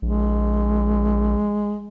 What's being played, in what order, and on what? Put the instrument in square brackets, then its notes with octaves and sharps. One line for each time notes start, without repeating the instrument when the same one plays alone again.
[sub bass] A#1 [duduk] G#3